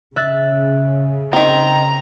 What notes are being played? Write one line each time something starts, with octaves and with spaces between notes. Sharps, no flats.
C#3 E5 F#6 A6
D#3 C4 A#5